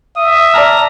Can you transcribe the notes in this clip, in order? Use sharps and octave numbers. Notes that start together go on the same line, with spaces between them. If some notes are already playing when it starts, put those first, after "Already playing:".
E5 D#6
D5 A5 A#5 F6